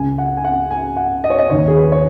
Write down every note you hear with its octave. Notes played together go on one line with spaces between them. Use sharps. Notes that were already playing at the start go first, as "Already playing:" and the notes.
Already playing: C#2 C#3 G#5
F#5
G#5
F#5
G#5
F#5
D#5
C#5
D#5
D#2 D#3 C#5
G#4
B4
C#5